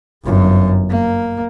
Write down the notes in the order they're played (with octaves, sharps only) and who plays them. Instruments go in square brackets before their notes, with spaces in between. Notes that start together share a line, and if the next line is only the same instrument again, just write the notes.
[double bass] G1 F#2
A#3